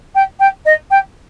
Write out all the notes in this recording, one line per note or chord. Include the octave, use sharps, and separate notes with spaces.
G5
G5
D#5
G5